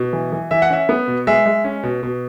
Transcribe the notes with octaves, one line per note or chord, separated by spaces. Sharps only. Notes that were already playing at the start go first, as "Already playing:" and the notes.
Already playing: B2
E3
E3
E3 E5
F#5
C#4 E5
B3
B2
G#3 E5
G#3
C#4
B2
B2